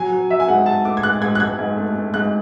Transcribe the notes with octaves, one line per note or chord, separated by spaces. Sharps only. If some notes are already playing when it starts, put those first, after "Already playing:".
Already playing: F#3 G#5
F#3
F#3 E5
G#5
G#2 F#5
G#2 A5
A3 D6
G#6
G#2 F#6
G#2 G#6
F#6
G#2 G#6
G#2
A3
A3
G#2 F#6